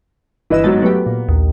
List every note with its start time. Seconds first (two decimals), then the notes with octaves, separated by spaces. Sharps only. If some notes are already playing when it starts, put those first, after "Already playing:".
0.50 G1 E3 B4 D#5 E6
0.64 G#2 F#3 B3 D#4 A6
0.82 F#3 A3 B3 G4
1.06 A#2
1.28 A#1 D#2